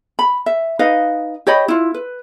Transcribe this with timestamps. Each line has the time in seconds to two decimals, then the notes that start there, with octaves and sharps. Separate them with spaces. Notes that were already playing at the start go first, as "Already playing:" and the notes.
0.19 B5
0.46 E5
0.79 D#4 B4 D#5 F5
1.47 G4 C#5 D#5 B5
1.68 E4 F4
1.94 B4